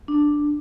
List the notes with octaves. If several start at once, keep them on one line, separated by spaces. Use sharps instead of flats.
D4